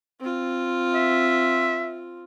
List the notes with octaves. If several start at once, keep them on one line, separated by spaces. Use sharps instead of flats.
C4 F4
E5